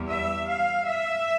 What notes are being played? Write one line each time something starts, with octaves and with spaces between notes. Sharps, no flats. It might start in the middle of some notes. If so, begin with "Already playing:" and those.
Already playing: E2 G3
E5
F5
E5